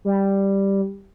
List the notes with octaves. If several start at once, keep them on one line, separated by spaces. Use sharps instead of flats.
G3